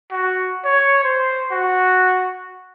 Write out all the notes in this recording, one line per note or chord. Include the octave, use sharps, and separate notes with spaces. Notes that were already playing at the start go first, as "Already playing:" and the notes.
F#4
C#5
C5
F#4